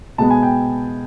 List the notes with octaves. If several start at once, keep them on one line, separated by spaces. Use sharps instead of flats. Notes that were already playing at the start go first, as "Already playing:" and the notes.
B2 G#3 B3 A5
G#5
G5